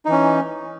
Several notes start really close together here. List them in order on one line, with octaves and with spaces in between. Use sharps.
D#4 E3 C#4